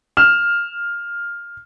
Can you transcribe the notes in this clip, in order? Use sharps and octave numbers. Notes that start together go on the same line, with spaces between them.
F6 E7